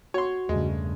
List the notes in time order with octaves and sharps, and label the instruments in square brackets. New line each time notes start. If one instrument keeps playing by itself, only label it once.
[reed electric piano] F#4 [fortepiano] C#5 C6
[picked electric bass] E2 A3 [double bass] G2 C#3 [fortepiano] G#3